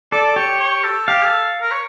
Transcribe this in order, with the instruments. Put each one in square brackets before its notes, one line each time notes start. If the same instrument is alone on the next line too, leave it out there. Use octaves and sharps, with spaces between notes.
[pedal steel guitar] A4 [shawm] D5
[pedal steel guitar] G4 [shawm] C#5
[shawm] C#5
A4
[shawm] G4 [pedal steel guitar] F5
[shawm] A4
A#4
C#5